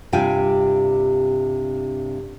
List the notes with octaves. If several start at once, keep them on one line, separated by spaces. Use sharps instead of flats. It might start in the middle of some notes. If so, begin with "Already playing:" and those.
G2 C3 D4 F4 G5 G#5